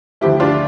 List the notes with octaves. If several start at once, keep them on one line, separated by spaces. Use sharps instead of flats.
D2 D3 F3 A3 E4 G4
D4 F4